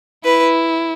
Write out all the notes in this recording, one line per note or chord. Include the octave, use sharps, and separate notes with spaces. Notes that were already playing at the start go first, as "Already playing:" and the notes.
E4 B4